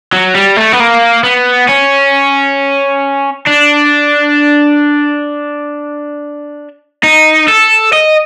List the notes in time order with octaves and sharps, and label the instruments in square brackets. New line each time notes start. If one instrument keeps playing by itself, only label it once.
[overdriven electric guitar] F#3
G3
A3
B3
A#3
B3
C#4
D4
D#4
A4
D#5